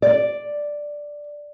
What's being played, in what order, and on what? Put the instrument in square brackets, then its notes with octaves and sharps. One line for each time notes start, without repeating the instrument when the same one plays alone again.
[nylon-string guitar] D5